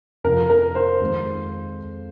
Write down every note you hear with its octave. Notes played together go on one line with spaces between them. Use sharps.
F2 C3 F3 A#4
A#4
C5
F2 D#3 G#3 C4